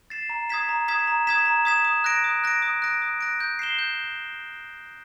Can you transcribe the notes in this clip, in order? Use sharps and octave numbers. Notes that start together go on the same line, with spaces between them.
A6 C7 E7
A#5
D#6 G#6 B6 E7
A#5
D#6 G#6 B6 E7
A#5
D#6 G#6 B6 E7
A#5
D#6 G#6 B6 E7
D#6
F#6 A#6 D7
D#6
F#6 A#6 D7
D#6
F#6 A#6 D7
D#6
F#6 A#6 D7
G6
C7 E7 G7
G6